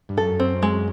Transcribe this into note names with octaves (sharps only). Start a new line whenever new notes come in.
G2
F#2 A4
C4
G#3